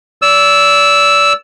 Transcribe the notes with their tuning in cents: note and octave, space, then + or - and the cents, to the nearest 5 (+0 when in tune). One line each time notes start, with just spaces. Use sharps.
D5 -30 E6 +0